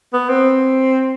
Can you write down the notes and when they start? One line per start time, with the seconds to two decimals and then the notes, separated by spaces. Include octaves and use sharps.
0.13 B3
0.29 C4